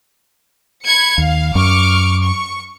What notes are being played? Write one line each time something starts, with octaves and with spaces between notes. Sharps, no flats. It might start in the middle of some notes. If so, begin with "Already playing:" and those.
B5 G#6 C#7
D#2 F5
F#2 C#6 D6 F6
C#6